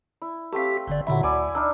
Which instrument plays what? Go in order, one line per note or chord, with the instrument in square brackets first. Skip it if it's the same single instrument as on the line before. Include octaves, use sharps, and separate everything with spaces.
[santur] E4
[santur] A3 C4 F5 [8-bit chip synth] G4 B6
[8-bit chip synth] G1 D3 D5
[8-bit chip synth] A#2 D3 E5 [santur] F#3 E4 B5
[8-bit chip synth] D2 [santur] E4 D5 G#5
[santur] D4 D#4 [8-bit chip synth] E6 F6